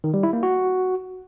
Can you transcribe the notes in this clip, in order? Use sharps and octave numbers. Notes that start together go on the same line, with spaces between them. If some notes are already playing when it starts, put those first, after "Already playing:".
D#3
G3
E4
A#3
F#4